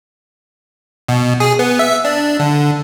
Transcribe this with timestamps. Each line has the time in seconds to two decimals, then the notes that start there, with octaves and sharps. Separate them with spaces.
1.08 B2
1.40 G#4
1.59 B3
1.79 E5
2.05 D4
2.39 D3